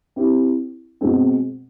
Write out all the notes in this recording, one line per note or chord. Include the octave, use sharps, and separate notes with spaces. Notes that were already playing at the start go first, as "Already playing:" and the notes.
C4 E4 G4
B2 G#3 C4